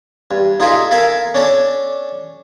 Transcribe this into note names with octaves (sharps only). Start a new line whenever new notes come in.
G2
D#4 F4 G#4 A4 D#5 E5
A4 A#4 E5 F5 G#5 A5
C#4 D4 A4 A5